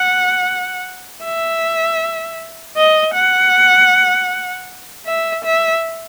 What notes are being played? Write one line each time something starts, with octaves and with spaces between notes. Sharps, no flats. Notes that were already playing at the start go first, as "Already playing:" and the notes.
Already playing: F#5
E5
D#5
F#5
E5
E5